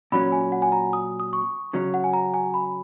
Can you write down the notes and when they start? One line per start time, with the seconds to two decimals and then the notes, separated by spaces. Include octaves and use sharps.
0.12 A#2 F#3 C#4 B5
0.32 G#5
0.52 F#5
0.62 G#5
0.72 A#5
0.93 D#6
1.20 D#6
1.33 C#6
1.73 C#3 F#3 C#4
1.94 F#5
2.04 G#5
2.13 A#5
2.34 G#5
2.54 B5